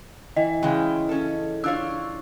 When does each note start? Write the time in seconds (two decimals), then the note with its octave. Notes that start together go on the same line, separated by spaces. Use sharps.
0.37 E3 D#5
0.63 C#3 E3 G#3 G5
1.09 C#4 A4
1.64 D4 F4 C#5 E6